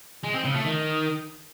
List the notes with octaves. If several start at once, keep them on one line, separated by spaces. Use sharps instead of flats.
G#3
C4
C#3
A3
D#3